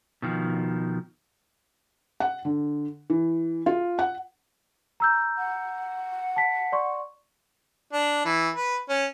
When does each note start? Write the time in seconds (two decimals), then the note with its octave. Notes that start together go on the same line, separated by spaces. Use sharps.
0.22 B2 D#3 F3
2.20 F#5
2.45 D3
3.10 E3
3.66 F4
3.99 F#5
5.00 A#5 E6 G6
5.38 F#5
6.36 A5 B6
6.72 D5 C6 C#6
7.92 D4
8.25 E3
8.56 B4
8.89 C#4